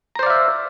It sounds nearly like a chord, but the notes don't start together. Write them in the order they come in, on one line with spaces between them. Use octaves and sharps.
A#5 C5 D5 F5 E5